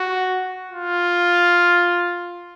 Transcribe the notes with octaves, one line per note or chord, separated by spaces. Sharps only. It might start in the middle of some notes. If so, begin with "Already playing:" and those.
Already playing: F#4
F4